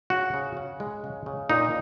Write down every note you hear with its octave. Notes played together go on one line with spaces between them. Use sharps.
C#3 F#4
C#3
C#4
G#3
C#3
C#3
A#2 D#4